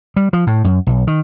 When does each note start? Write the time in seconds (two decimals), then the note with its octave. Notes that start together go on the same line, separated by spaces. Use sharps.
0.16 G3
0.33 F3
0.47 A2
0.64 F#2
0.87 B1
1.07 D#3